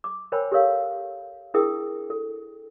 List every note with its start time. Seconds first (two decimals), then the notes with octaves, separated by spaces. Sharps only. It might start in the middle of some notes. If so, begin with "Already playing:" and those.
0.04 D6
0.32 A#4 C5 C#5 G5 G#5 B5
0.52 G4 A4 A#4 C#5 F5
1.54 D4 E4 G#4 A#4 G5 D#6
2.10 A4